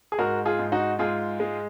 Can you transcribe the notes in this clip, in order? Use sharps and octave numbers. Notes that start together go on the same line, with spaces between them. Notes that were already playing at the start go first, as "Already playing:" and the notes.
G#4
G#2 F#4 A#4
F4 G#4
G#2
D#4 F#4
G#2 F4 G#4
G#3